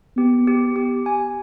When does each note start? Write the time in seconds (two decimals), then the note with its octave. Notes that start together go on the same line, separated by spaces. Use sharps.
0.17 B3 G4
0.47 G4
0.76 G4
1.06 G#5